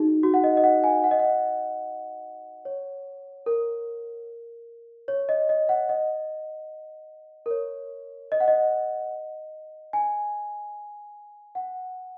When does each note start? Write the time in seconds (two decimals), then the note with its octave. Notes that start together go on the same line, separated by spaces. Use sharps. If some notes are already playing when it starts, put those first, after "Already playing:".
Already playing: D#4 F#4 G#4
0.23 F#4
0.34 F#5
0.44 D#5
0.57 D#5
0.64 F#5
0.84 G#5
1.04 F#5
1.11 D#5
1.20 F#5
2.65 C#5
3.46 A#4
5.08 C#5
5.29 D#5
5.49 D#5
5.69 F#5
5.89 D#5
7.46 A#4
7.51 C#5
8.32 D#5
8.40 F#5
8.48 D#5
9.93 G#5
11.55 F#5